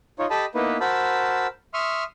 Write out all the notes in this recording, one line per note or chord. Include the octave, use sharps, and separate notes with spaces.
D#4 F4 C#5
G4 A4 D#5 A5 B5
A#3 B3 D#4 E4 B4
F#4 A#4 C5 A5 B5 E6
E5 C6 C#6 D#6 F6